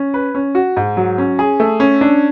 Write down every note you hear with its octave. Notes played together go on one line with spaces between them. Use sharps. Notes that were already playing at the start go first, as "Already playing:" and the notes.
Already playing: C#4
B4
C#4
F#4
G#2
F#3
C#4
G#4
A3
C#4
D4